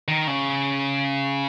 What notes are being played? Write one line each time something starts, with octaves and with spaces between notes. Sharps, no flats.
D#3
C#3